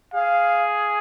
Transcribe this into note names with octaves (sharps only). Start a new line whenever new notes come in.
G#4 F5